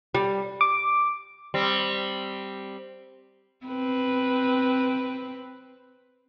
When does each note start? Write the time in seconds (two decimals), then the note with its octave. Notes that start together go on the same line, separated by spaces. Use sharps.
0.15 G3
0.61 D6
1.54 G3 C4
3.66 C4 B4